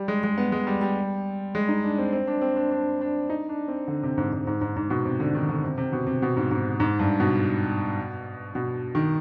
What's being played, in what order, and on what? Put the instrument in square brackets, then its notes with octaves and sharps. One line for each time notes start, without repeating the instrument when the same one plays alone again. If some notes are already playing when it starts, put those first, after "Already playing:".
Already playing: [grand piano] G3
G#3
G#3
B3
G#3
G3
G3
G#3
D#4
D4
C4
C4
D4
C4
D4
D4
D4
D#4
D4
C4
D3
C3
G#2
G#2
G#2
G#2
G#2
B2
C3
D3
D#3
D3
C3
C3
B2
C3
B2
G#2
G#2
G#2
G2
B2
B2
D#3